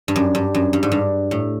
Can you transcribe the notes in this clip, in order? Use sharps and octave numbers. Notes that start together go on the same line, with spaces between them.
G2
F#2
G2
F#2
G2
G#2
G2
A2